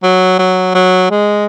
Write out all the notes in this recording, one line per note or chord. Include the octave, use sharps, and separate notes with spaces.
F#3
F#3
F#3
G#3